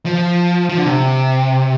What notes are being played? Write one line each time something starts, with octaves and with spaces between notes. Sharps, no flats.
F3
F3
D3
C3